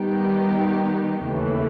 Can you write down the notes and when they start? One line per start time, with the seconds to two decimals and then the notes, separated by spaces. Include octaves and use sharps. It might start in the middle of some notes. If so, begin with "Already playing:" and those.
Already playing: D#3 G3 B3 D#4 G4
1.27 D#2 C#3 E3 A3